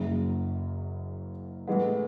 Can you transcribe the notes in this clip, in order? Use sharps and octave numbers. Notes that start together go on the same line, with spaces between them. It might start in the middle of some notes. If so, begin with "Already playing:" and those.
Already playing: F#1 F#2 C#3
A2 E3 G#3 B3